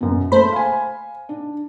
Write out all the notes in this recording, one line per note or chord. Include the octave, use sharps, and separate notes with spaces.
F#2 B2
A3 C5 B5
F5 G#5
D4